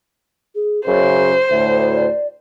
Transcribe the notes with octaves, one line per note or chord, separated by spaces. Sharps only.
G#4
F#2 C#3 G#4 C5
D2 A2 E5
D5